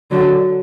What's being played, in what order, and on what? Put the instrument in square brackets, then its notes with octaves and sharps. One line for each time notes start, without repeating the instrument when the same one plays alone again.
[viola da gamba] D3 F#3